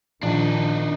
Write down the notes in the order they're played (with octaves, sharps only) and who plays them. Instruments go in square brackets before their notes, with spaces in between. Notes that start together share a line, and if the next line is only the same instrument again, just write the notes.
[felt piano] A#1 [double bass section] D#3 [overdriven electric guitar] D4 D#4